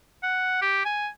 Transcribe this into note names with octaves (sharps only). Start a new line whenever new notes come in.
F#5
G4
G#5